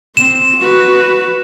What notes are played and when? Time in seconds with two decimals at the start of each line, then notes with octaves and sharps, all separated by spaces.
0.17 C4 E7
0.58 F#4 B4